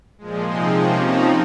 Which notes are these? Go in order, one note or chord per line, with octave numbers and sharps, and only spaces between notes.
A#2 F3 G#3
C3 F3 G#3 C4 D#4 C6
C3 F3 A#3 C#4 C#6
F3 C4 D#4 D#6